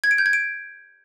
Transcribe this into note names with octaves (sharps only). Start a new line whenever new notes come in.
G#6
D7
G6
G#6
D7